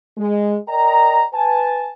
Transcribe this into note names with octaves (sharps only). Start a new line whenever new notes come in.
G#3
A#4 D5 D#5 G5 A#5
B4 G#5 A5